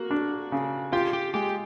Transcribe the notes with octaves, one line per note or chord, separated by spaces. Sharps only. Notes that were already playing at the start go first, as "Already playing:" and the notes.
Already playing: A#3 F#4
D4
C#3
F4 G4
G4
G#3 G4